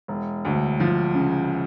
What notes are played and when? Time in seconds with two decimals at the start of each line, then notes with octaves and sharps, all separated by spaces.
0.08 E1
0.45 D2
0.80 F3
1.14 C#3